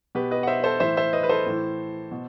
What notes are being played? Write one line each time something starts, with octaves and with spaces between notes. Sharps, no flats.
B2 G4 B4
B4 D#5
F#5
C5 E5
A4 C5
A2 E3 C5 E5
C5 E5
B4 D#5
B4
A4 C5
A2 E3
B2